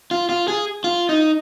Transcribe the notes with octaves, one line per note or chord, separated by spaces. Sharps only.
F4
F4
G#4
F4
D#4